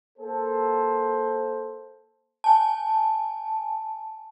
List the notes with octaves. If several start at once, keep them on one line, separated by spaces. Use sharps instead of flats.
A#3 A4 C5
G#5 A5